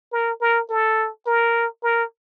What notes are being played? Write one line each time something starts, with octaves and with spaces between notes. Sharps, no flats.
A#4
A#4
A4
A#4
A#4